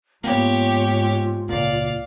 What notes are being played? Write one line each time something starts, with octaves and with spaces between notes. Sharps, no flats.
G#2 A#3 B3 F4 G4 C#5
C#2 A#2 D5 F5